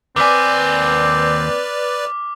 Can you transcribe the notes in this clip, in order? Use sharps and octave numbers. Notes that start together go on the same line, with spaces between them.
D#2 C4 B4 D5 G#5 D6 F6 B6